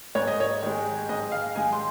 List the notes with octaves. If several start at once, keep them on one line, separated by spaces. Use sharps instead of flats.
G#2 C#5
D#5
C#5
D#3 G#3
G#2 D#5
F5
D#3 G#3 G#5
C6